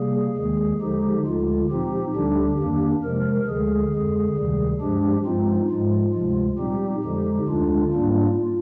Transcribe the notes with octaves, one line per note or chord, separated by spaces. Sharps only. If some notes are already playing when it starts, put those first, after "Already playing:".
Already playing: C3 G3 A#3 G#4
D#2 D#3 G#3
D3 F3 G#3 D#4 G4
D2 D3 G#3 F4
A#2 F3 C4 D#4 G4
D2 D3 G3 D4
F2 D#3 A#3 D4
C3 F3 G#3 A#4
D2 D3 G#3 G#4
F2 D3 G#3
D2 C3 D#3 G3
G2 F3 G#3 D4 G4
G2 F3 G#3 C4 D#4 F4
G#2 F3 G#3
D2 C3 F3 G#3
A#2 G3 C4 D#4 G4
F2 D3 F3 G#3 D#4 G4
D2 D3 G#3 D4 F4
G#2 G3 A#3 D4